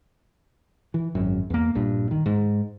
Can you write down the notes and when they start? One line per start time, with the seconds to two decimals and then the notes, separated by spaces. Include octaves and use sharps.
0.94 E3
1.15 G#1 F#2
1.50 E2 A#3
1.75 A#1 G2
2.11 D#3
2.26 G#2